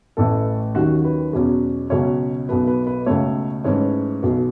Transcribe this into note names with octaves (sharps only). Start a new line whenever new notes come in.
A1 A2 E3 A3 A4
D#2 D#3 F#3 C#4 F#4
B4
E2 B2 F#3 C#4
C#2 B2 F#3 C#4 C#5
B1 B2 F#3 B4
B4
B4
C#2 B2 A3 C#5
G#2 E3 A3 C#4 C#5
B1 B2 F#3 B3